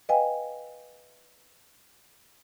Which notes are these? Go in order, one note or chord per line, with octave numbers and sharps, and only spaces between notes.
B4 D#5 F5 G5 G#5